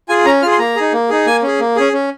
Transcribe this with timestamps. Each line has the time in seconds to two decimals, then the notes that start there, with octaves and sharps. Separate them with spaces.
0.09 F4 G#4 G#5
0.26 C#4 A#5
0.42 F4 G#4 F6
0.51 C6
0.59 A#3 A#5
0.76 D#4 G#4
0.93 A#3
1.09 D#4 G#4
1.26 A#3 G#5
1.42 C#4 G#4
1.60 A#3
1.76 C#4 G#4
1.93 C#4